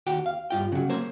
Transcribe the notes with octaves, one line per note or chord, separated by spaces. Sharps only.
D#2 F#4 G5
F5
G2 F4 G5
C#3 F#3
A#3 C5 C#5